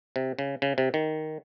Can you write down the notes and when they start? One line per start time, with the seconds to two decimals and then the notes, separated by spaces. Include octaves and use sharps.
0.16 C3
0.39 C#3
0.62 C#3
0.78 C3
0.94 D#3